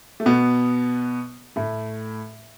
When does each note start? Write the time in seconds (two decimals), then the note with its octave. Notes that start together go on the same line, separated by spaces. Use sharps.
0.20 A3
0.26 B2 B3
1.56 A2 A3